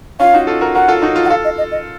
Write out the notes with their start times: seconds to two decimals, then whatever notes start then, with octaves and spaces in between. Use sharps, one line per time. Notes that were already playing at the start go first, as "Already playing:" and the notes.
0.20 C#4 F4 F5
0.34 D#4 F#4
0.47 F4 A4
0.61 F#4 A#4
0.74 F#4 A#4 F#5
0.88 F4 A4
1.02 D#4 F#4
1.16 F4 A4
1.25 F#5
1.30 F4 A4 F5
1.44 D#5
1.58 D#5
1.72 D#5